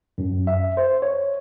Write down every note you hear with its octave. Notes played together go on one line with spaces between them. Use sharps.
F#2
E5
C5
C#5